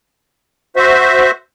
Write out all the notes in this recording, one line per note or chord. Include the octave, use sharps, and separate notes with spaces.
F#4 C5 E5